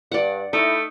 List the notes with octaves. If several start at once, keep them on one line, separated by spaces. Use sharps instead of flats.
G2 D5 F#5
A3 D#4 E4